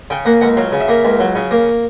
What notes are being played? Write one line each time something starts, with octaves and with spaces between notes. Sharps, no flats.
C#3 G5
A#3 F#5
C#2 F#5
F#3 F5
C#3
E5
A#3
C#2
F#3
C#3
A#3